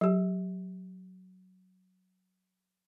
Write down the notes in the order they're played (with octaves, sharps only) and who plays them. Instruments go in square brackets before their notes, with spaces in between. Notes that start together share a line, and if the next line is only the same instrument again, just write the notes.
[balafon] F#3 G4